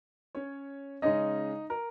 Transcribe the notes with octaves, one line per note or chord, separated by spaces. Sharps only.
C#4 C#5
C#3 G#3 C#4 D#4 D#5
A#4